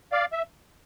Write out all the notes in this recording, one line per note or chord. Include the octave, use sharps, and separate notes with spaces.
D5 F5
E5